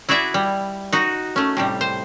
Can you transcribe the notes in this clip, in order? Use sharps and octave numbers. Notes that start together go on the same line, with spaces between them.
E4 F#4 G#4 D5 E5
G3
D#4 F#4
A3 C#4
A2 C3 G3
C5